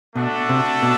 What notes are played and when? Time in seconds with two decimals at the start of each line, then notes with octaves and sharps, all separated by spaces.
0.15 B2 A3 D4 F#4 A4 D5
0.49 C3
0.82 B2